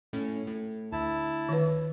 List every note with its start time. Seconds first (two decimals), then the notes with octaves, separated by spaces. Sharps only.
0.13 A2 C#4
0.47 A2
0.92 D2 E4 A5
1.49 D#3 B4